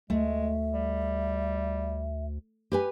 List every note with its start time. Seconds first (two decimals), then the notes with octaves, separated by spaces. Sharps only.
0.10 D2 G#3 A3 E5
0.73 G3
2.72 G4 B4 G#5